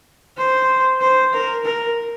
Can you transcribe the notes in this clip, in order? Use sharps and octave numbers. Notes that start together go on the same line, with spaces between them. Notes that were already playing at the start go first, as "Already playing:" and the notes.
C5
C5
A#4
A#4